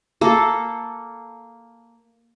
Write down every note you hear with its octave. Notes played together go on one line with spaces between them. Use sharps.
A#3 A4